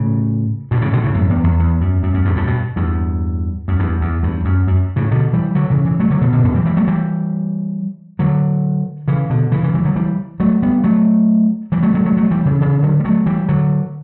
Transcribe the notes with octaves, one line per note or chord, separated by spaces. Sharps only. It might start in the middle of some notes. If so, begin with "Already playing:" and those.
Already playing: A2 C#3
G2 B2
A2 C#3
B2 D3
A2 C#3
F#2 A2
E2 G2
E2
E2
F#2
F#2
F#2
E2 G2
F#2 A2
G2 B2
E2 G2
F#2
E2 G2
E2
E2 G2
F#2
F#2
A2 C#3
B2 D3
E3 G3
D3 F#3
C#3 E3
C#3 E3
F#3 A3
D3 F#3
B2 D3
B2 D3
G2 B2
E3 G3
E3 G3
F#3 A3
E3 G3
D3 F#3
C#3 E3
B2 D3
C#3 E3
C#3 E3
E3 G3
D3 F#3
E3 G3
F#3 A3
G3 B3
F#3 A3
E3 G3
F#3 A3
F#3 A3
F#3 A3
F#3 A3
E3 G3
C#3 E3
C#3 E3
D3 F#3
G3
F#3 A3
E3 G3
D3 F#3